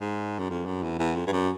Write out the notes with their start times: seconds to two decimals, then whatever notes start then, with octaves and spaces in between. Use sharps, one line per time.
0.01 G#2
0.39 F#2
0.50 F2
0.66 F#2
0.83 E2
0.99 E2
1.15 F2
1.27 G2
1.32 F#2